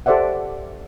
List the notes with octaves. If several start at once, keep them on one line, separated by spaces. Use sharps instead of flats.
G4 A4 C5 D5 E5 F#5